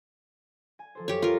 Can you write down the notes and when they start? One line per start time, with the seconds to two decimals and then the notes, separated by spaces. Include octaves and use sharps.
0.79 G#5
0.95 F3 A4 C5
1.08 F#2 G4 C#5
1.22 G3 F4 A#4